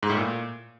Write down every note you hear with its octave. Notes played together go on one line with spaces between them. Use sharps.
G#2
A2
A#2